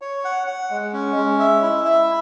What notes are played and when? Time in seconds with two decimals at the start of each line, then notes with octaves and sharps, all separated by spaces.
0.02 C#5
0.25 F#5
0.47 F#5
0.70 G#3
0.93 C#4
1.16 G#3
1.39 E5
1.62 E4
1.85 E5